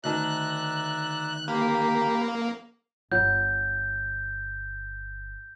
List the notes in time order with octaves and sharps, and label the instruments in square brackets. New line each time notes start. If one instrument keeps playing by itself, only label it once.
[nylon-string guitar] D2 D#3 A5 [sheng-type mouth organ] D5 E5 A#5 [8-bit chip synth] F#6
[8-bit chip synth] A#3 [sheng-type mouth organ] G4 A#4 B5
[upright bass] G1 [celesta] F4 C#5 F#5 [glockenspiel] G6